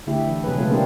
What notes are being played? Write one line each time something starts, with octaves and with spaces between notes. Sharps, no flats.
D3 A3 E4 G4
E3
B2 F#3 G#4 B4
C#3 G#3 A3 B3 F4 A4
G#3 A#3 C4 D4 E4 G4